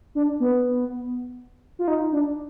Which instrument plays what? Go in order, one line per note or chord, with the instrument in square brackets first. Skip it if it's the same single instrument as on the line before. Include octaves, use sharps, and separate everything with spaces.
[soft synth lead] D4
B3
F4
D#4
D4